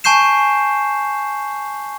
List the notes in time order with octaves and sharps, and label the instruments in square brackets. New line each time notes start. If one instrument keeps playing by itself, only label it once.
[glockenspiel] G#5 A5 C#6 G6 C7 E7